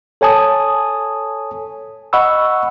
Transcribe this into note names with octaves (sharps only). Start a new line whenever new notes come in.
A4 C#5 G#5 A5 D#6
D#5 F#5 B5 C#6 E6